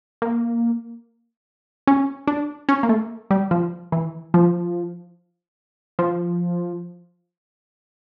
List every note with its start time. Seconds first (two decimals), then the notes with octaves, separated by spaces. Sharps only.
0.22 A#3
1.87 C#4
2.27 D4
2.69 C#4
2.83 A#3
2.89 A3
3.31 G3
3.51 F3
3.92 E3
4.34 F3
5.99 F3